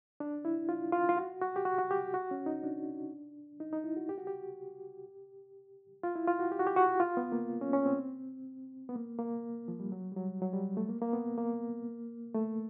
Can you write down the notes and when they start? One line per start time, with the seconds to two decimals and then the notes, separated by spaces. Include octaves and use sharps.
0.20 D4
0.45 E4
0.69 F4
0.93 F4
1.09 F4
1.17 F#4
1.42 F#4
1.56 G4
1.65 F#4
1.78 F#4
1.91 G4
2.14 F#4
2.31 C#4
2.46 D#4
2.63 D4
3.60 D#4
3.73 D#4
3.84 E4
3.97 F#4
4.09 G4
4.18 F#4
4.27 G4
6.03 F4
6.15 E4
6.27 F4
6.39 F#4
6.51 G4
6.59 F#4
6.67 G4
6.77 F#4
7.00 F4
7.17 B3
7.32 A#3
7.61 C#4
7.73 C#4
7.86 C4
8.89 B3
8.95 A#3
9.19 A#3
9.68 F3
9.80 G3
9.92 F#3
10.12 G3
10.16 F#3
10.42 F#3
10.53 G3
10.77 A3
10.89 A#3
11.01 A#3
11.13 B3
11.38 A#3
12.34 A3